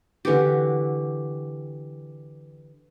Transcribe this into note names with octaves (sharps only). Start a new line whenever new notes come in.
D3 E3 F#4 G4